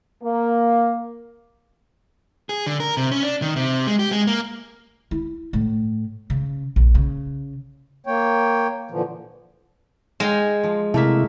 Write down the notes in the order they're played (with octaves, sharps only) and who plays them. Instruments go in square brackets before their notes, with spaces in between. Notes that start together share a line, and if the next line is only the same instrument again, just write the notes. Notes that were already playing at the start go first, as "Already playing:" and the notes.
[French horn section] A#3
[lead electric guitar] G#4
D3
A#4
C3
C#4
D4
D#3
C3
G#3
G4
G#3
A#3
[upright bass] E4
A2
C#3
A#1
C#3
[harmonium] A#3 C#5 G5
A#2 D3 E3 F3
[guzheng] G#3 [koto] F5 G5 G#5
[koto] F3
[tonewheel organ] C3 E4 [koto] A3 A#3 E5